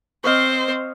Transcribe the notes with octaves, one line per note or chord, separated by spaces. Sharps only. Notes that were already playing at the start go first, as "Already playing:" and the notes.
C4 C5 C#5 D#5 F5